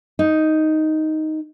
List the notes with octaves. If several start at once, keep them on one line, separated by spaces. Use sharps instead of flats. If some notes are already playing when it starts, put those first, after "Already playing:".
D#4